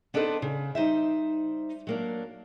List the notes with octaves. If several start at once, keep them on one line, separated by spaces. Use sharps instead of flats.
B3 D4 D#4 A4 B4 C5
C#3
G3 D#4 C5 E5
F#3 A#3 D4